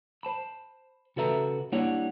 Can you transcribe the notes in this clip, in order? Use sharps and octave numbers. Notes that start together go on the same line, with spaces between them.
C5 A5 B5
C#3 F#4 A4 B4 E5 A#5
G3 A#3 D4 E4 C#5 F#5